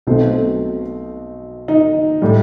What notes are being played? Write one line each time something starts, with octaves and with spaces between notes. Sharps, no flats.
B1 B2 F#3 A3 C4
D#4
A2 G3